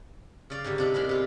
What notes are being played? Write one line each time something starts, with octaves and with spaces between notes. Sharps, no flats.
C#3 D5 F5
G#2 D3 G3
C3 D4 D#4
E2 G#3 A#4 B5
C3 F4